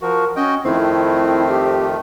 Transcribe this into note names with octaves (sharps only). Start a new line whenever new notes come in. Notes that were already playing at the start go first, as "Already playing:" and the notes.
F3 F#4 A#4
C#4 F#4 D#5 G5
F2 D#3 A3 C4 E4
G4